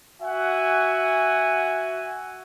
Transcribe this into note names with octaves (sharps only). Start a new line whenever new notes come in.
F#4 E5 F#5 G#5